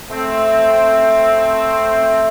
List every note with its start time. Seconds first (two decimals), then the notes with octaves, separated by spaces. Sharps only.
0.10 A3 C4